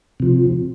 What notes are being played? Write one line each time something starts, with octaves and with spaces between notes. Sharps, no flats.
C3 F3